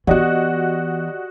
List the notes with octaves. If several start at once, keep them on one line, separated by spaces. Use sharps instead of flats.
E3 B3 F#4 G4 D5 D#5 F#5